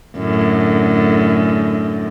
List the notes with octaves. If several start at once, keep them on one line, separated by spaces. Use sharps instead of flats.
F#2 A2 D3